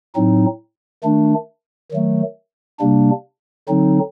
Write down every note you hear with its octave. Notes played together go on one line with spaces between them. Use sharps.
A2 F#3 C4 D#4
D#3 A3 D4
D#3 F#3 A3
C3 G3 A#3 D4
D3 F#3 C4 D#4